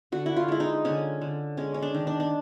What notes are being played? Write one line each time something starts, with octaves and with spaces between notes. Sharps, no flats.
D3 F#4
E4
F4
G#3 E4
D#4
D3 C#4
D3
G#3 C#4
C#4
D4
D#3
D4
D4